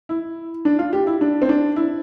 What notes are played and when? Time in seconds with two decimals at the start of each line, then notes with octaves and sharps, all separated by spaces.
0.09 E4
0.65 D4
0.79 F4
0.93 G4
1.07 E4
1.21 D4
1.42 C4
1.49 D4
1.76 E4